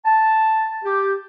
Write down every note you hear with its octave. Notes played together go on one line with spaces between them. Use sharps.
A5
G4